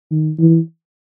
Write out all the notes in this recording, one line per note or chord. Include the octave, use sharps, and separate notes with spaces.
D#3
E3